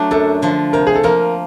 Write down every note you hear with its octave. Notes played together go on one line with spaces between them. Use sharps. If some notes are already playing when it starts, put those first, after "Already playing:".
Already playing: F#3 A3 D4
F#2 A4
D3 F3
C3 A#4
G#4
A4
F3 A#3 A#4